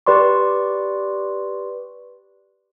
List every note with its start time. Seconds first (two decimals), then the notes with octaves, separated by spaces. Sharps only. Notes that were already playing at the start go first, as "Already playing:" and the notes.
0.07 G4 B4 D5 C6 C#6